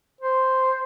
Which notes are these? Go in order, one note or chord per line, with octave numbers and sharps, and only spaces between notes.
C5